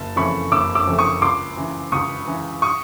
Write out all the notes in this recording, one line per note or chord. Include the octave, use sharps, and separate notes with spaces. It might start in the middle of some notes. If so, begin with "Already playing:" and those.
Already playing: F#1 A5
F2 C#3 E3 A3 B5 C#6
F#1 D6 E6
D6 E6
F2 C#3 E3 A3
C#6 D#6
C#2 C6 D6
C#3 E3
C#2 C#6 D#6
C#3 E3
C#6 D#6